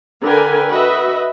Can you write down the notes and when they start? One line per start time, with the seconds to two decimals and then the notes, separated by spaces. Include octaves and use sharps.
0.22 D3 A#4 B4 G5 G#5
0.69 F#4 B4 D#5 E5